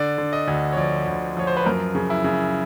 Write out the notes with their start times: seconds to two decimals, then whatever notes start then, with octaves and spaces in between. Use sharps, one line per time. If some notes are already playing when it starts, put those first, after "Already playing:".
Already playing: D3 D5
0.18 D3
0.33 D#5
0.48 D2
0.73 C#5
0.77 F3 D5
1.07 D2
1.37 F3 C#5
1.47 C5
1.57 B4
1.66 F#2 A#4
1.95 C#3
2.10 E4
2.24 C#3